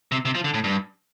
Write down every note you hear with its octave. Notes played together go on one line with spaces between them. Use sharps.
C3
C3
F3
D3
A2
G2